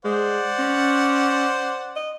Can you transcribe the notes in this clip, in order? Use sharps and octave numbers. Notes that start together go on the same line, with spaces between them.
G#3 C5 D5 F#5
C#4
D#5